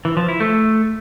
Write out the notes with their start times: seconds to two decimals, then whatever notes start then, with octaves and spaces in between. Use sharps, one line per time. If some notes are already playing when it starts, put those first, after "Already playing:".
0.05 E3
0.17 F3
0.29 E4
0.40 A3